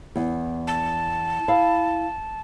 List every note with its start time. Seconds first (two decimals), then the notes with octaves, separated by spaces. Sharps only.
0.16 E2
0.67 A5
1.48 E4 F5